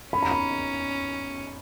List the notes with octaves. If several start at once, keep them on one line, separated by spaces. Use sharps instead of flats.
C#4 B5
A#5
B5